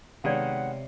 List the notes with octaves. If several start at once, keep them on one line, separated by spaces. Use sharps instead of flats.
C3 D#3 G#3 B3 C#5 D5 F5 F#5